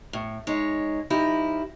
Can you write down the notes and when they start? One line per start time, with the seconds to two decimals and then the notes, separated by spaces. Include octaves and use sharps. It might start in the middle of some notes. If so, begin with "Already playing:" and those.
0.13 A2
0.47 G#3 D#4 C#5
1.10 F3 D#4 E4 G4